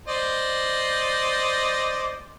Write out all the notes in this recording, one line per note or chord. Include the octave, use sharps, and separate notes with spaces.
C5 D5 D#5